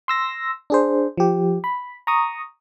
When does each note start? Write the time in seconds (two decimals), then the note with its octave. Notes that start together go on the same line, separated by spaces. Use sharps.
0.08 C6 E6 A#6
0.70 D4 G#4 C5
1.17 F3 G4
1.64 B5
2.07 A#5 C#6 D#6